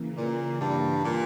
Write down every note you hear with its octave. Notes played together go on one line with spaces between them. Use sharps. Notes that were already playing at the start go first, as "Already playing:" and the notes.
Already playing: C#3 E3 A#3
A#2
G2
A#2